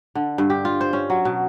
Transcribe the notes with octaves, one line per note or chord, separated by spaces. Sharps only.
D3
G2
G4
F4
C5
C#4
F#3
B2